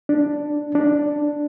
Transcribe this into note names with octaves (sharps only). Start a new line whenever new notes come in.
D4
D4